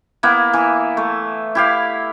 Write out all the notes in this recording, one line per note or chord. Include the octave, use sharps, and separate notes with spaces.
A#3 B3 E4
E3
A3
E4 G4 F5